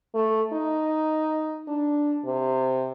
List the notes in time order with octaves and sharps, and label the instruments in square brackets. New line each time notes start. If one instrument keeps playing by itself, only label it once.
[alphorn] A3
D#4
D4
C3